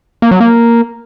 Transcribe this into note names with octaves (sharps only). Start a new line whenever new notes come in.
A#3
F#3
A#3